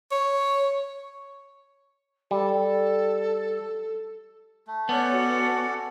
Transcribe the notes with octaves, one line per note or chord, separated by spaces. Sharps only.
C#5
G3 A4
A3
B3 C#4 A4 C#5 D5 F#5 G6
F#4